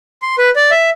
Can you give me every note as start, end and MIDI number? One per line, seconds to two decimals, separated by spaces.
0.22 0.36 84
0.38 0.50 71
0.56 0.70 74
0.71 0.90 76